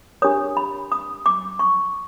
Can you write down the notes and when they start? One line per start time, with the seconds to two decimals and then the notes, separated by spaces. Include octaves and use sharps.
0.22 D4 G4 A#4 C#5 D#6
0.57 B5
0.92 D#6
1.26 D6
1.59 C#6